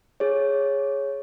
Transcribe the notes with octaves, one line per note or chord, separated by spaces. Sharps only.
G#4 C#5